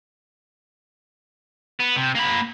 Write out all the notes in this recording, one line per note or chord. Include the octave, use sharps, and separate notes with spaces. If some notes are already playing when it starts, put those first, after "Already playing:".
B3
C3
A#3 B5